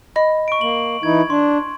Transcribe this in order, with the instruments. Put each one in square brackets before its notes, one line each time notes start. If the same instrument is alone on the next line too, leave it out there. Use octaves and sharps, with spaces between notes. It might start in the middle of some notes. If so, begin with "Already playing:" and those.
[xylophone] D#5 B5
[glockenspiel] C#6 D7
[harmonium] A#3 [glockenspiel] F#7
[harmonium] E3 D#4 E4 [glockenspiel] G#6
[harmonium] D4 [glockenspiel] C6